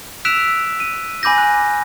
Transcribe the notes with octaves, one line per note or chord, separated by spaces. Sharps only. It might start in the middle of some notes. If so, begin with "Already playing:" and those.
E6 F#6 B6 D7 E7 F7
D#7
G#5 B5 D6 G6 A#6
F#6